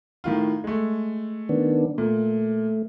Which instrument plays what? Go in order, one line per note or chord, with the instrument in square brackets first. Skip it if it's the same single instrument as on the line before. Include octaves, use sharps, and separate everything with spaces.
[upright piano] A2 D#3 F4
G#3 A3
[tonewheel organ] D#3 B3 D4
[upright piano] A#2 [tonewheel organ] A3